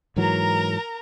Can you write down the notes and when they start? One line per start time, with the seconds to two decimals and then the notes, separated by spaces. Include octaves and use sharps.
0.17 G#2 E3 F#3 A#4 A#5